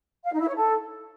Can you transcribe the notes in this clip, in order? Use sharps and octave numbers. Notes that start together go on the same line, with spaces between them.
F5
D#4
E4
C#5
A4